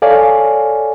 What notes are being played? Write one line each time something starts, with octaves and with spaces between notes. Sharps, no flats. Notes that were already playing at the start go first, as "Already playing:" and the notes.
A4 C#5 D5 F5 G#5